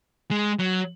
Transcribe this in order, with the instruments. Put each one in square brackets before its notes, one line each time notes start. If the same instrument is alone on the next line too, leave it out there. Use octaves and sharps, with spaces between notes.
[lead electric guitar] G#3
F#3